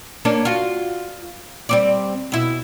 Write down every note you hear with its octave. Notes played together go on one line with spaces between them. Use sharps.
A#3 C#4 D4
F4 F#4
G3 C4 D5
B2 E4